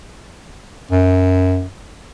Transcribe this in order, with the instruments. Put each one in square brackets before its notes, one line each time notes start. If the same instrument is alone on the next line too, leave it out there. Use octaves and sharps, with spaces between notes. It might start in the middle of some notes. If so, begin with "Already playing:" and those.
[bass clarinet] F#2